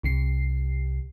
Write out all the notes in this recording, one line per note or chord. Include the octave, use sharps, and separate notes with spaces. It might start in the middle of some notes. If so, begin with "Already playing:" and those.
C2 C3 C7